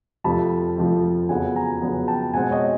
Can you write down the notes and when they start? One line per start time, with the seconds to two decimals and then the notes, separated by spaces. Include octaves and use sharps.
0.24 F2 C3 F3 A3 C4 A5 B5
0.78 F2 C3 F3 A3 C4
1.29 F2 C#3 F#3 B3 F#5 G#5
1.56 G#5 A#5
1.82 F2 C#3 F#3 B3
2.08 G5 A5
2.34 B2 G#3 C4 F#5 G#5
2.51 C#5 D#5